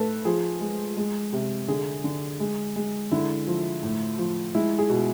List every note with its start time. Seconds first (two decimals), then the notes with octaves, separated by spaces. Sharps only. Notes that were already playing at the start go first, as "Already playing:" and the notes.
Already playing: A2 A3 A4 B4
0.25 F3 G#4
0.61 G#3
0.97 G#3
1.33 C3
1.68 D3 G#4
2.04 D3
2.40 G#3
2.76 G#3
3.12 D3 E4
3.47 F3
3.83 A2
4.18 F3
4.55 G#3 E4
4.79 G#4
4.90 B2